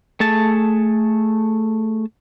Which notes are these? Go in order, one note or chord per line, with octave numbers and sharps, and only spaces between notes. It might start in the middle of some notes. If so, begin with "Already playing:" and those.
A3 G#4 A5